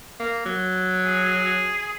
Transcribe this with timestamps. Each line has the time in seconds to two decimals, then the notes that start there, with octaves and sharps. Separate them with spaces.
0.20 A#3
0.45 F#3
1.05 G#4